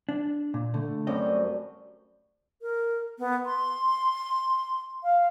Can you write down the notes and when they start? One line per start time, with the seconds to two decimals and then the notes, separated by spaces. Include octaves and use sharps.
0.09 D4
0.54 A#2
0.74 D3 A3
1.07 F#2 C3 G3 D#5
2.62 A#4
3.19 B3
3.46 C6
5.03 F5